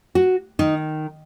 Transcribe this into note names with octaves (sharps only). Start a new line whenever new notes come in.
F#4
D#3 D#4